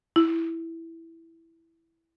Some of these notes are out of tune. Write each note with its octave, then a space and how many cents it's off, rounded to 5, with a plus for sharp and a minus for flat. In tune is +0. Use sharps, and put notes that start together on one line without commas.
E4 +0